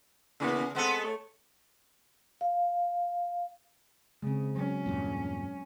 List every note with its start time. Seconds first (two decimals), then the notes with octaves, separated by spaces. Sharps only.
0.40 C#3 E3 A#3 B3
0.75 G#3 B3 C4 A4 F#5
1.04 A3 C#5
2.41 F5
4.23 C#3 G#3 C4
4.56 F#3 C#4
4.86 E2 G2 A#2